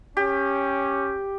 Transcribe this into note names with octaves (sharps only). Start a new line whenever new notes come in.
C#4 G4